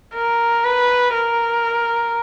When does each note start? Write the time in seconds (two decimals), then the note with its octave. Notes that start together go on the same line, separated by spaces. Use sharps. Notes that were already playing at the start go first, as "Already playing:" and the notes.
0.15 A#4
0.64 B4
1.14 A#4